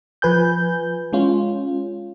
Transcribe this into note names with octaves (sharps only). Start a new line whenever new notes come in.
F3 B4 G#5 G6
G#3 C#4 F4